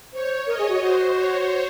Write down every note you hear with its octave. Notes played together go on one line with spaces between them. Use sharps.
C5 C#5
A#4 D#5
G#4
F#4
F#4 C5
C#5